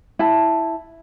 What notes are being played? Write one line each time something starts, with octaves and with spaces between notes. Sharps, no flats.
E4 A5